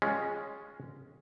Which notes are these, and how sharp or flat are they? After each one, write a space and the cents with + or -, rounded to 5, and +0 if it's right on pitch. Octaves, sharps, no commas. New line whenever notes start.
G#3 +0 C#4 +0 F4 +0